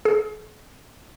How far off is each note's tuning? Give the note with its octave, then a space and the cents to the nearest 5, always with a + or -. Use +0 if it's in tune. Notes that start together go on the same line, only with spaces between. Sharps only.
G#4 +45